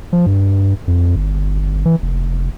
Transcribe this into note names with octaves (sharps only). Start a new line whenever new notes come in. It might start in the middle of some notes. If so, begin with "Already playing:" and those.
F3
G2
F2
G1
E3
F1